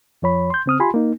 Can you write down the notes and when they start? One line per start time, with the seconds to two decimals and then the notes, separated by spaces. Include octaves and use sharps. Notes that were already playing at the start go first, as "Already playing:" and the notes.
0.22 F2 F3 C#5 B5
0.50 C6 G6
0.66 C#3 C4 D#6 F6
0.80 F4 G4 G#5 B5 C6
0.94 A#3 D#4